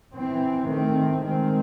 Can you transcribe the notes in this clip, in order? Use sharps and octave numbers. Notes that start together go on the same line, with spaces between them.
E3 C4
D#3 A3 C4
D#3 G#3 C4